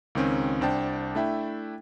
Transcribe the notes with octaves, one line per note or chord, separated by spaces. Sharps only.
C#2 D#3 C4 C#4
C2 D4 C5 G5 A5
A3 D4 E4 E5 G5